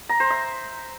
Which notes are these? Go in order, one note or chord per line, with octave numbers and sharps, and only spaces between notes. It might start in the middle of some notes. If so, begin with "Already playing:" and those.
A#5
C5
E5